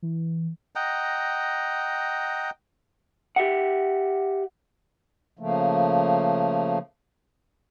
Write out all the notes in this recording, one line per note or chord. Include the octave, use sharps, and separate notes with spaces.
E3
D#5 F#5 G5 A#5
G4 E5 F#5
C#3 F3 A3 A#3